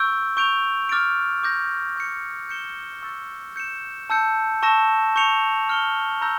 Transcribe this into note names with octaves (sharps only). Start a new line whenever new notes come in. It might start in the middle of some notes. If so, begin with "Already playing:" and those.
Already playing: C#6 E6 G6 D7
C#6 G6 D7 F7
D6 F6 A6 D7
D6 G6 A#6
C#6 G6 C#7
G6 C#7 E7 G7
C#6 E6 A6
G6 C#7 E7
A5 E6 G6 C#7
A5 C#6 E6 A#6 E7
C#6 G6 C#7 F7
F6 C#7 G7
A#5 E6 G6 A#6